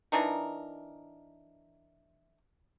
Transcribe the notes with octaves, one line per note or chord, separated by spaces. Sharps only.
E3 D4 D#4 A#4